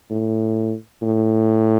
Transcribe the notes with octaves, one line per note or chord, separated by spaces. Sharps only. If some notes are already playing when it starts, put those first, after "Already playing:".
A2
A2